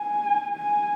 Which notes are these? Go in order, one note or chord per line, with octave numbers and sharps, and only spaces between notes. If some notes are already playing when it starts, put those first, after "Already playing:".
Already playing: G#5
G#5